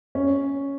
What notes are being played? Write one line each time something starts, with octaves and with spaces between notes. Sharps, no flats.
C#4